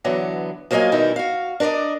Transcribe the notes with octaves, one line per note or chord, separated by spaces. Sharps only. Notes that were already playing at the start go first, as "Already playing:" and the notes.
D3 E3 F#3 B3
F3 F#3 A#3 F4 D#5 G#5
B2 D#3 E3 G3 D#4 E4
F#4 F5
D4 A#4 C5 D5 D#5